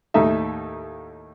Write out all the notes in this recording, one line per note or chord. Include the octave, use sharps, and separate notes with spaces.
D#2 A2 D#4 A4 E5